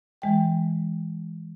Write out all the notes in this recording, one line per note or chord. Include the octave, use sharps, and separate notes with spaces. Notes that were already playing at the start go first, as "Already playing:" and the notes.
E3 G#3 G5